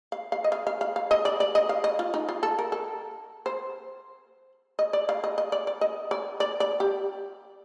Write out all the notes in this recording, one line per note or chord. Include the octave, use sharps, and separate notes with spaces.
F5
F5
D#5
F5
F5
F5
F5
D#5
D5
D5
D#5
F5
D#5
F4
D#4
F4
A4
A#4
A4
C5
D#5
D5
F5
D#5
D#5
D5
D5
D#5
D5
D5
D5
G4